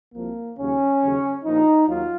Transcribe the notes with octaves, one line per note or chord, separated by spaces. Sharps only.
C2 C3 F3 A#3
D#2 C#3 F#3 C#4
D#2 C#3 F#3
A#1 A#2 F3 D#4
D#2 D#3 F#3 F4